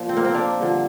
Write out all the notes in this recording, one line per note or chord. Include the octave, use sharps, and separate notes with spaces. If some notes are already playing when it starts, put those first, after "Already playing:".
Already playing: A#2 F3
C4
A#3
C4
A#3 D4
G2 D3 F3